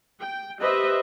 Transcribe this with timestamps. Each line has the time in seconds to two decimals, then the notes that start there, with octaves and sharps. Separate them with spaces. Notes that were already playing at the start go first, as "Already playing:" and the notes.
0.21 G5
0.59 G4 B4 C5 D#5 E5